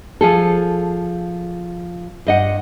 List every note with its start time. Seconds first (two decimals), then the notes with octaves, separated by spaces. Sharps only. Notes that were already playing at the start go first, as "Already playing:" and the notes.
0.21 F3 G#4 A4
2.27 G2 D#5 F#5